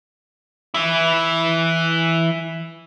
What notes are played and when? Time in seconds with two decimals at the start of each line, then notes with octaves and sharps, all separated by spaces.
0.74 E3 E4